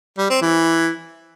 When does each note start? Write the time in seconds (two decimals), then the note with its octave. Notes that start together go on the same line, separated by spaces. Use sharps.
0.18 G3
0.30 C4
0.42 E3